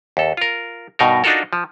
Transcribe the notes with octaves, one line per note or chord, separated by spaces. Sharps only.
D#2 A4
F4 A#4
G2 B2 D#4 A#4
D4 D#4 F4 F#4 A4 A#4
F3